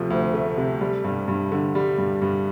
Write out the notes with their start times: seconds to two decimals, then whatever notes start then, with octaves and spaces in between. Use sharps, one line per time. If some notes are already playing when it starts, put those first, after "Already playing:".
Already playing: D2 C3 F3 A3
0.10 D2
0.34 A3
0.57 C3
0.81 G3
1.04 G2
1.28 G2
1.52 D3
1.75 G3
1.98 G2
2.22 G2